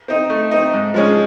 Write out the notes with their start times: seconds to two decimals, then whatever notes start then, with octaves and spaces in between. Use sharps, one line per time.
0.08 C4 D#4
0.30 A3
0.51 C4 D#4
0.73 G#2
0.94 F3 G#3 C#4